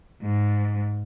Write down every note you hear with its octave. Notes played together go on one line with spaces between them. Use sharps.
G#2